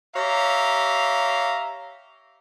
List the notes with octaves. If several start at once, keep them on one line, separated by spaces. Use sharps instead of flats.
G4 C#5 E5 F5 A#5